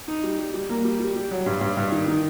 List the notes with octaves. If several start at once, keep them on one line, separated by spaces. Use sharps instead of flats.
D#4
G3
G3
G3
A#3
G3
G3
G3
F#3
G2
G2
G2
D#3
D#3